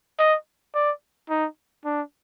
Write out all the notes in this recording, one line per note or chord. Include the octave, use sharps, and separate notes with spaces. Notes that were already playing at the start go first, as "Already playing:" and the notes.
D#5
D5
D#4
D4